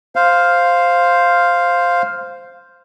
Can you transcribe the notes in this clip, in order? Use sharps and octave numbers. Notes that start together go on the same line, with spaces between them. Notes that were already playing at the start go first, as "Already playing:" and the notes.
C5 F5